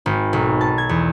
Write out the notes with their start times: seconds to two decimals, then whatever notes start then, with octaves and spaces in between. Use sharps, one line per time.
0.06 G#1
0.33 B1
0.61 A5
0.78 G#6
0.89 E2